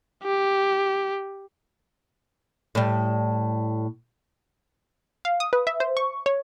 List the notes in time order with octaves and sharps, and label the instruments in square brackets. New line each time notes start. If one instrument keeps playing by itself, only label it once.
[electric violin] G4
[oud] A2 G3
[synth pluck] F5
D#6
B4
E5
C5
C#6
C#5